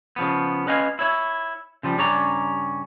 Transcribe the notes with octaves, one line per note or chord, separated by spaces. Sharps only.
C#3 F3 B3
C#4 B4 D#5 F5 G5 G#5
E4 C#5 E5
C#3 F3 G3
G2 C#3 C#4 D5 A#5